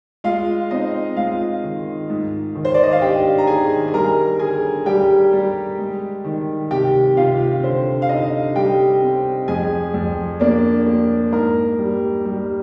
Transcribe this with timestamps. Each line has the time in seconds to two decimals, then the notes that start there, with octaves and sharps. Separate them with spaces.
0.24 G#3 F4 F5
0.71 C4 D#4 D#5
1.16 G#3 F4 F5
1.64 D#3
2.10 G#2
2.55 D#3
2.65 C5
2.74 D5
2.83 D#5
2.92 F5
3.02 D4 G4 G5
3.38 A#5
3.47 D#3 G#4 G#5
3.88 G#5
3.94 G3 A#4 A#5
4.39 D3 G#4 G#5
4.86 G3 G4 G5
5.33 G3
5.78 G#3
6.25 D#3
6.71 C3 G4 G5
7.17 C3 F4 F5
7.63 D3 C5
8.02 F5
8.09 D3 D#4 D#5
8.55 G3 G4 G5
9.02 C4
9.48 F2 G#4 G#5
9.94 F2
10.40 A#3 D4 D5
10.86 A#3
11.32 G#2 A#4
11.79 G3
12.25 G3